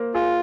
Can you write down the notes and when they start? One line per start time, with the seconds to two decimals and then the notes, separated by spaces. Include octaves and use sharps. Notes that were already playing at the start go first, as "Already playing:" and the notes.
Already playing: A#3 C5
0.14 F4 G#4